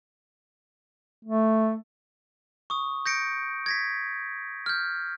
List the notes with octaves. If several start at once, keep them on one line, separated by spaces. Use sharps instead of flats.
A3
C#6 D#6
G6 A#6 C#7 D7
G#6 A#6 B6
F6 G6